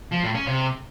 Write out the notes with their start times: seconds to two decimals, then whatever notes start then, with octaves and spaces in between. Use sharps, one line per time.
0.12 F3
0.23 A2
0.35 C#4
0.47 C3